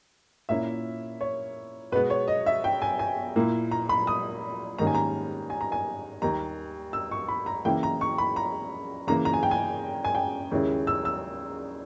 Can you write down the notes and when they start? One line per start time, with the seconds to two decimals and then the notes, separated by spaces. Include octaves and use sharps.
0.49 A#2 A#3 C#4 E4 E5
1.21 C#5
1.92 B2 G#3 B3 B4
2.10 C#5
2.28 D#5
2.46 E5
2.64 G5
2.82 G#5
2.99 G#5
3.36 A#2 A#3 E4
3.71 A#5
3.89 B5
4.07 D#6
4.78 G#2 D#3 G3 A#3 C#4 A#5
4.87 G#5
4.95 A#5
5.50 G#5
5.61 A#5
5.72 G#5
6.21 D#2 D#3 G3 A#5
6.93 E6
7.11 C#6
7.29 B5
7.46 A#5
7.65 C#3 E3 A#3 E4 G5
7.83 A#5
8.01 C#6
8.18 B5
8.36 A#5
9.07 C#3 E3 A#3 A#5
9.25 A#5
9.34 G#5
9.43 G5
9.51 G#5
10.05 G#5
10.15 G5
10.51 D#2 C#3 G#3 C#4 E4
10.87 E6
11.05 E6